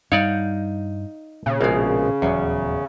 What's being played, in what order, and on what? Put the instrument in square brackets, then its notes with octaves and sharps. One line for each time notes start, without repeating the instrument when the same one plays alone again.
[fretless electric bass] G2 G3 [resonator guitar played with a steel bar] D#4 F5 [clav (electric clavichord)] C#5 D5 F#5
[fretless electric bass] A#2 [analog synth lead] C#3
[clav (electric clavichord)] A#1 [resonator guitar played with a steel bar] B2 G#3
[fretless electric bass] D#1 F#3 [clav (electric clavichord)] E2 [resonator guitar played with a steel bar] B3 C#4